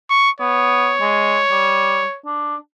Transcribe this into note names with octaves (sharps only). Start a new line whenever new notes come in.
C#6
B3 C#5
G#3
G3
D4